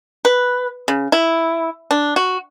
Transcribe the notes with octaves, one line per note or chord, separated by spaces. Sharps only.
B4
C#3
E4
D4
F#4